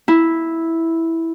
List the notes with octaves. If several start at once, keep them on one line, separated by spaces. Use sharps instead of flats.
E4